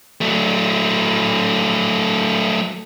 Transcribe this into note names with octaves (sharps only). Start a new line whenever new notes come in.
F#3 A3